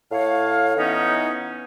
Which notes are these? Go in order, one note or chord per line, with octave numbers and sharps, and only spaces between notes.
A2 C#5 F5
E3 B3 C#4 D#4